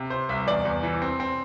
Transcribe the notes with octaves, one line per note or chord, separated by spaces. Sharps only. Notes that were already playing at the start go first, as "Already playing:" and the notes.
Already playing: C3
C3 C5
C2 E5
E2 D5
E2
E3
C4
C4